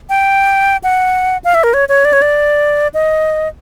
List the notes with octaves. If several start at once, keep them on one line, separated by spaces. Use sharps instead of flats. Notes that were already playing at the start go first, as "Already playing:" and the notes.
G5
F#5
F5
E5
A#4
C#5
C#5
D5
C#5
D5
D#5